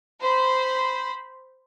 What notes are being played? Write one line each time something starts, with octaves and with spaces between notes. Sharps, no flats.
C5 B5